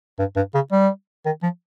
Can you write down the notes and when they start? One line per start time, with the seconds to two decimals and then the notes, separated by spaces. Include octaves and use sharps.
0.19 G2
0.36 G2
0.55 C#3
0.72 G3
1.26 D#3
1.43 F3